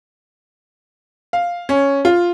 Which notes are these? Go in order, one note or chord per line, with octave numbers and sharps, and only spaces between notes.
F5
C#4
F4